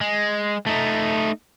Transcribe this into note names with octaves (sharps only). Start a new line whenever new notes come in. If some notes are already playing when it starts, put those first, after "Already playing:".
G#3
A3 D#4